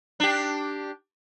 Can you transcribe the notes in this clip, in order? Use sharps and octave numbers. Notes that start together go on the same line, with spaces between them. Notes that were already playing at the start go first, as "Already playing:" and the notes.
D4 G4